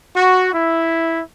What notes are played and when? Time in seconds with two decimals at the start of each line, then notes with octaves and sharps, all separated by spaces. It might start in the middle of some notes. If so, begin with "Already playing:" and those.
0.16 F#4
0.53 E4